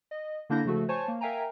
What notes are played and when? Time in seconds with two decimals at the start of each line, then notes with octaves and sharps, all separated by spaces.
0.11 D#5
0.49 D3 A#3 D4 E4 G6 A#6
0.65 C#3 F3 A3 F#4 A4
0.88 C5 C#5 G#5 A5 C#6
1.08 A#3
1.21 A#4 E5 F5 G5 G#5 A#5